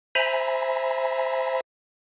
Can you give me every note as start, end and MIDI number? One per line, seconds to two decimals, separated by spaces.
0.15 1.61 72
0.15 1.61 76
0.15 1.61 80
0.15 1.61 82
0.15 1.61 83